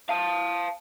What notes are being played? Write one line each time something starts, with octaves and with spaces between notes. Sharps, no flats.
F5 A5